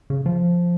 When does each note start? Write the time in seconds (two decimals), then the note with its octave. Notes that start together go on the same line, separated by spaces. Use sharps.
0.10 C#3
0.26 F3